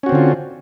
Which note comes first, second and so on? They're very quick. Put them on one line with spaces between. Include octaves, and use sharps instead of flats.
C#4 F#4 C4 D3 F4